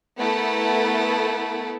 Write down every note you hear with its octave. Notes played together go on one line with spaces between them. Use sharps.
A3 B3 E4 A4 A#4